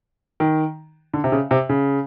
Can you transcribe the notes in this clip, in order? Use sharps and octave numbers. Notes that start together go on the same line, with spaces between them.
D#3
D3
C3
C#3
C3
C#3